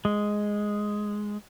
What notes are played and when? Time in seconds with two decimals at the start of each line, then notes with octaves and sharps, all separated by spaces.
0.05 G#3